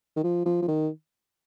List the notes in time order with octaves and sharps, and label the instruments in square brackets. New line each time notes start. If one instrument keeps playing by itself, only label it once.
[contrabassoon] D#3
F3
F3
F3
D#3